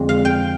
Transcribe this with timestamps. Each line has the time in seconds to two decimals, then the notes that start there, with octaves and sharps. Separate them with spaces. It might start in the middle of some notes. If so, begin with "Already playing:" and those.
Already playing: F2 D3 G#3 C4
0.09 F5
0.25 G5